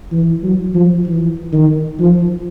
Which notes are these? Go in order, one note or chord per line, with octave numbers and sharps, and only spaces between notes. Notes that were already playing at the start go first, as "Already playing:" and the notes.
E3
F#3
F3
E3
D#3
F3